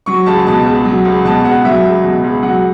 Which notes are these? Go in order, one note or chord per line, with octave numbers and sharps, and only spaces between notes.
F#3 C#6
C#2 A5
B2 A5
C#2
F#3
C#2
B2 A5
C#2 F#5
F#3 E5
C#2
B2
C#2
F#3 F#5